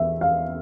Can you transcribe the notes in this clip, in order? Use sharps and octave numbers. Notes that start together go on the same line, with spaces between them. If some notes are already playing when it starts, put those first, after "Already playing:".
Already playing: E2 E5
F5